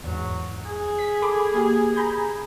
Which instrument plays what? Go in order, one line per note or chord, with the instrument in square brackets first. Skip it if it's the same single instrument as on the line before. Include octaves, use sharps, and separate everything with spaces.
[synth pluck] E2 G#2 [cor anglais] F#3
[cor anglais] G#4
[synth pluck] B6
A4 B5 D6
A#3 G4
A#5 B5 G6